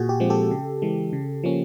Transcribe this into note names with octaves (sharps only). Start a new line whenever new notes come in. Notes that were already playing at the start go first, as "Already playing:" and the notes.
Already playing: A#2 F#4 G#4
G4
F3 G#3 C4
G4 A4
C#3
E3 G#3
C#3
F3 A#3 C#4